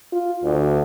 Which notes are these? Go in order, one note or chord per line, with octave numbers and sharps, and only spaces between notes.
F4
D2